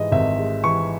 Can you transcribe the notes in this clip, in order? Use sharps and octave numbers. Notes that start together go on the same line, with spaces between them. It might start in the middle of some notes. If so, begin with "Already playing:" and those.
Already playing: G#2 E3 D#5
G#1 E5
G#3
E3 C#6